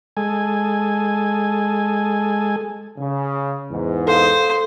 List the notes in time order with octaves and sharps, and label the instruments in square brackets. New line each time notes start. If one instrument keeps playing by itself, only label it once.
[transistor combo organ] G#3 A4 G#5
[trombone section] C#3
E2 G#2
[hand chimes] A4 F5 [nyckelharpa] C5